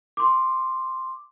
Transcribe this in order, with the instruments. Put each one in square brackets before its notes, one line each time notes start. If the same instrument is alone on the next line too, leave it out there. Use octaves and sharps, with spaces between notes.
[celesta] C6 D6